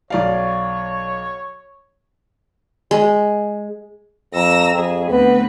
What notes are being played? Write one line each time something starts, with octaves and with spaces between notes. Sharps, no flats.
B1 C#5 D5 F5
G#3
F2 A#5 E6 A#6
F2 G#4
D2 B3 C4 B4